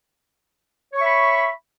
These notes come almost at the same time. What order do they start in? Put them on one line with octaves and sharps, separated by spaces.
C#5 C#6 E5 B5